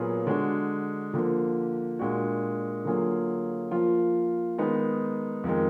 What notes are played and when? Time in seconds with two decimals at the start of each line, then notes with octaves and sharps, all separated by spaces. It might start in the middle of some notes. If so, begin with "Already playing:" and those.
Already playing: A#2 F#3 B3 F4 G#4
0.27 D3 G#3 D4 F#4
1.14 D3 F3 A#3
1.99 A#2 G#3 D4 F#4
2.85 D3 F#3 A#3 F4 G#4
3.71 F3 A#3 F4
4.58 D#3 G#3 B3 D#4
5.44 F2 D#3 G#3